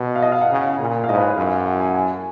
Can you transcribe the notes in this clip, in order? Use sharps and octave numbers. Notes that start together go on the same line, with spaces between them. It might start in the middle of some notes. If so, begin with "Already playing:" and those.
Already playing: B2
F5
D#5
F5
F#5
C#3
A#2
F5
G#2 D#5
B4
C#5
F#2 F5
F#5
G#5
G#5